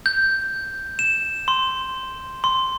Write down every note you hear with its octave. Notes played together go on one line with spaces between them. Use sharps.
G6
E7
C6
C6